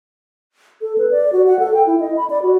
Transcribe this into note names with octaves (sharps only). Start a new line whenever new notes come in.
A4
B4
D5
F#4
F#5
A4
G5
E4
D#5
B5
D5
F#4